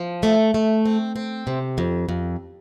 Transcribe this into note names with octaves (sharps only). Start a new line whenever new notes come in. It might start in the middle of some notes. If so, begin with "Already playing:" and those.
Already playing: F3
A3
A3
C4
C4
C3
F2
F2